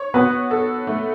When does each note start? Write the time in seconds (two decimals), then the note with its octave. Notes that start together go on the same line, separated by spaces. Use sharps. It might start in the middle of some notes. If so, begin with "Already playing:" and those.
Already playing: C#5
0.14 B3 F#4 B4
0.51 A4
0.87 A3